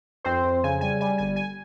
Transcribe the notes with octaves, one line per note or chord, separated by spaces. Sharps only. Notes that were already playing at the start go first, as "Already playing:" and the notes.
F2 C4 C5
F2
C#3 G#5
G3 G#5
G3 G#5
G1 G#5
G#5